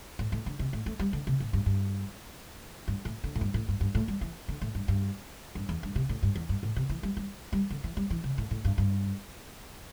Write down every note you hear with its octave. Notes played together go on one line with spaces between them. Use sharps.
A2
A2
D3
C3
A2
A3
G3
D3
C3
A2
G2
G2
G2
A2
D3
A2
G2
A2
G2
G2
A2
G3
E3
D3
A2
G2
G2
G2
E2
G2
C3
A2
G2
E2
G2
A2
C3
E3
G3
G3
G3
D3
E3
G3
E3
C3
A2
A2
G2
G2